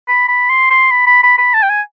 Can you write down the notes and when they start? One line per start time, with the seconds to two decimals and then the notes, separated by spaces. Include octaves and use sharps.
0.08 B5
0.28 B5
0.49 C6
0.70 C6
0.91 B5
1.07 B5
1.23 B5
1.38 B5
1.54 A5
1.62 G5
1.70 G#5